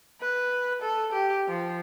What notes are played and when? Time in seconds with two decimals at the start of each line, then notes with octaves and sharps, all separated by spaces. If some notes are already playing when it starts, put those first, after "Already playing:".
0.21 B4
0.82 A4
1.12 G4
1.48 F3